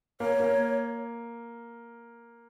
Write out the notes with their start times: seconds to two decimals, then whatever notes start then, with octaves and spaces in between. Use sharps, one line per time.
0.20 A#3 C#5
0.40 A#3